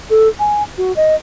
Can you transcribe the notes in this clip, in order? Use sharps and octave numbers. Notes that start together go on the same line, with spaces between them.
A4
G#5
F#4
D#5